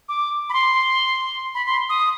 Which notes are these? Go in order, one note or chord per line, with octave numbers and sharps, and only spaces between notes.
D6
B5
C6
B5
C6
D#6